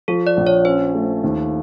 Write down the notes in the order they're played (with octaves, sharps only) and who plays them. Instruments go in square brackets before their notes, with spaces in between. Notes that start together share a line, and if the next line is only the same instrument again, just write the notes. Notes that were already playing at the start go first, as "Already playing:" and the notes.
[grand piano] F3 [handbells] A4
[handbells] D5
[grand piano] A#1
[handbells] C#5
[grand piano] C#4 [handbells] C5
[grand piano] A3
D#2